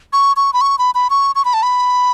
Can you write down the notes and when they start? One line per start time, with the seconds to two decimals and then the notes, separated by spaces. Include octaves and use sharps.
0.13 C#6
0.37 C#6
0.53 B5
0.61 C#6
0.78 B5
0.95 B5
1.10 C#6
1.36 C#6
1.45 B5
1.54 A5
1.63 B5